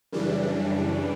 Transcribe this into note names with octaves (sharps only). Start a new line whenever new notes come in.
F#2 C#3 E3 G3 D4